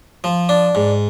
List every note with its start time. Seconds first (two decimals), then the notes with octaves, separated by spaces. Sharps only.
0.24 F3
0.49 D4
0.75 G#2